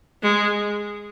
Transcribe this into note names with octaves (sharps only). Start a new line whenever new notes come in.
G#3